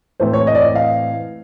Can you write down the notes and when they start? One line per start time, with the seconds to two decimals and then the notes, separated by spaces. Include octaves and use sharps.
0.20 A2 E3 A3 C4 C5
0.33 C#5
0.47 D#5
0.55 D5
0.61 D#5
0.75 F5